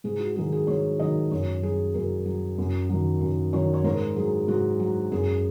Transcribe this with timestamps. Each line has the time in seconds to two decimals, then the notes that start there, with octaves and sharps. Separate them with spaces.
0.04 G#2 G#4
0.20 F#4
0.36 D#3 F#3 G#4
0.52 G#4
0.67 G#2 C#5
1.00 D#3 F#3 D#5
1.31 F#2 C#5
1.62 F#3 G#4
1.94 F#2 A#4
2.26 F#3
2.58 F#2
2.89 D#3 F#3
3.21 F#2
3.53 D#3 F#3 C#5
3.74 C#5
3.84 G#2 A#4
4.16 F#3 G#4
4.48 G#2 F#4
4.80 F#3
5.12 F#2 G#4